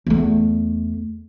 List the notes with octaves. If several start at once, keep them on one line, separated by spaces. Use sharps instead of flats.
E2 A3